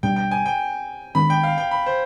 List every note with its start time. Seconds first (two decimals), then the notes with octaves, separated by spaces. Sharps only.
0.03 B2 G3 D4 G5
0.16 G5
0.31 G#5
0.46 G5
1.15 D#3 G#3 B3 D4 B5
1.30 G5
1.43 F5
1.58 G5
1.71 B5
1.86 C5